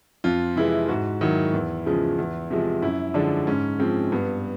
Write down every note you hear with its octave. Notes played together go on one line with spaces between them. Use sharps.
F2 F4
C3 E3 G#3 E4
G#2 F#4
D#3 F#3 E4
E2
C#3 F3 G#3
E2
C3 F3 G#3
F#2 E4
D3 F3 G#3 D4
G#2 C#4
F3 G#3 C4
G2 B3